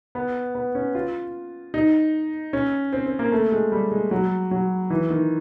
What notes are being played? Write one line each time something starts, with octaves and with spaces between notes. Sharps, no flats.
B3
B3
C#4
F4
D#4
C#4
C4
C4
A#3
A3
G#3
G3
G#3
F#3
F#3
E3
D#3